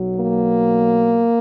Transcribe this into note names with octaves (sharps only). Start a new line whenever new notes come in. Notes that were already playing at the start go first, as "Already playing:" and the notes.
Already playing: B1 B2 F#3
A#3